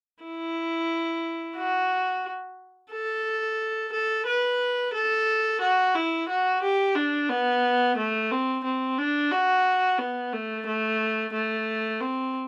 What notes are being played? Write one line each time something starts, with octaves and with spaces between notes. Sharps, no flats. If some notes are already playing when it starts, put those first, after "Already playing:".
E4
F#4
A4
A4
B4
A4
F#4
E4
F#4
G4
D4
B3
A3
C4
C4
D4
F#4
B3
A3
A3
A3
C4